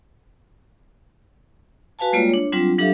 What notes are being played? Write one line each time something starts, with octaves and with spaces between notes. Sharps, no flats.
F#4 B4 F5 G#5 A5
G3 G#3 A#3 F4 C#5 D5
D4 C#5
F#3 G3 C4 D4 F4
F#3 D4 G4 A4 E5 F5